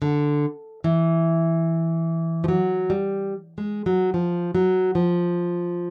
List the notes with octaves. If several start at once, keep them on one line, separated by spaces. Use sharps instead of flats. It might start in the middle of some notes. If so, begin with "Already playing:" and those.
D3
E3
F3
F#3
G3
G#3
F#3
F3
F#3
F3